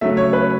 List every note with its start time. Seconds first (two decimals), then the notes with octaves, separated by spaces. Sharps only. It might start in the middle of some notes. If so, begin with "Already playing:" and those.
0.01 C#3 F#3 A3 E5
0.17 C#5
0.33 B4